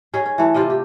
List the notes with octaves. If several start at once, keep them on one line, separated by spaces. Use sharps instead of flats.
C#4 D#4 G#4
C#4
E3 A3
C3 F4 D5 D#5
G4